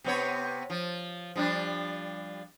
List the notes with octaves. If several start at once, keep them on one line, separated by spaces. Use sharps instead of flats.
C3 B3 C#5
F3
F3 G3 D4